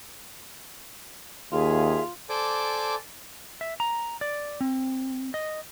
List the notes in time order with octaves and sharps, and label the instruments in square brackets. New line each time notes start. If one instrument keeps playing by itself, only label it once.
[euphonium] D#2 [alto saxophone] F4 [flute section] G#4 E5
[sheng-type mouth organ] A4 C5 D5 G#5 D6
[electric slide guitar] E5
A#5
D5
C4
D#5